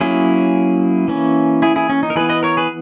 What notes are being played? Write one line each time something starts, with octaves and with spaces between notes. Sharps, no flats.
F#3 A#3 C#4 E4 G#4
E3 A#3 C#4
E4 G#4
E4 G#4
C#4
D#4
A#4
E3 B3 G#4 B4
B4 D#5
A#4 C#5
G#4 B4